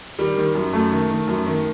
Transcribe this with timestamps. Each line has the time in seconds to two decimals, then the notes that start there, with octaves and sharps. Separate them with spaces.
0.19 D#3 G3
0.37 D#3
0.55 F#2
0.73 F#2 A3
0.92 D#3
1.10 D#3
1.27 F#2
1.46 D#3